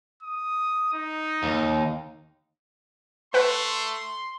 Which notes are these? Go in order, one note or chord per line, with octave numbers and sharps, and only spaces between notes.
D#6
D#4
D#2
A3 B4 F#5 C6